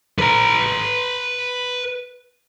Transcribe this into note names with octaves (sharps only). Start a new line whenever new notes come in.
B4 A#5